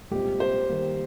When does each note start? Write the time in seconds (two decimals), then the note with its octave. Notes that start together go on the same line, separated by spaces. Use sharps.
0.11 C2 A#2 G#3 C4 G4
0.40 C5
0.69 D#3 G3 A#3